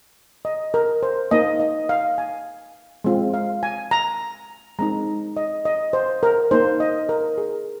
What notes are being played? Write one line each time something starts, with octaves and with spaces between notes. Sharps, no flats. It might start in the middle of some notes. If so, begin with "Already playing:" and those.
D#5
A#4
C5
A#3 D#4 D#5
D#5
F5
G#5
G#3 C4 F4
F5
G#5
A#5
G#3 C4 D#4 A#5
D#5
D#5
C5
A#4
A#3 D#4 C5
D#5
A#4
G#4